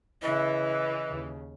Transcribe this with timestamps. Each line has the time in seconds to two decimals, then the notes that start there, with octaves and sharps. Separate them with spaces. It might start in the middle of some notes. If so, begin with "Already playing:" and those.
0.22 C#3 E3 E4 D#5
1.08 D#2 C#3